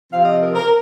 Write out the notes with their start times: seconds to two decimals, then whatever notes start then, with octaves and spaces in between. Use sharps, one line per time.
0.12 C3 F3 C4 F5
0.25 D#5
0.41 A#4
0.55 A#4